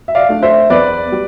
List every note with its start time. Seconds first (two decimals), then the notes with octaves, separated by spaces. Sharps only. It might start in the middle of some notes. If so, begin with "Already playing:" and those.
0.08 E5
0.15 D5 F5
0.29 A3 D4
0.43 C5 E5
0.70 E2 B4 D5
1.12 G3